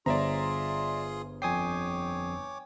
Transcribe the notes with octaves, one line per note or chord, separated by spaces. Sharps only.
G1 F4 G#4 C5 D5 E5 A#5 C6
F2 C#5 G5 G#5 D6 D#6 C7